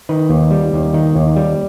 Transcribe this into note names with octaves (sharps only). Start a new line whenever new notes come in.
D#3 B4
D#2
G3
D#2
D#3
D#2
G3